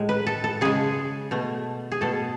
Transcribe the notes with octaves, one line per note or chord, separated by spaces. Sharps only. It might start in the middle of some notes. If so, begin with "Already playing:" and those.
Already playing: A2 G#3
B4
A4
A4
C#3 G#3 G#4
B2 A3
G#4
B2 A3 A4